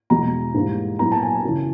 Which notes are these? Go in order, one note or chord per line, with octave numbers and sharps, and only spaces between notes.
E2 B2 G#3 A#5
G#2 E3 G3 A#3
A#2 F#3 B3 E4 A#5
A5
G#5
A5
F#2 C#3 E3